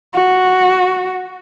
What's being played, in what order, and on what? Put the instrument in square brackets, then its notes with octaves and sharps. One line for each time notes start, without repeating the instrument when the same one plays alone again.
[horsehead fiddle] F#4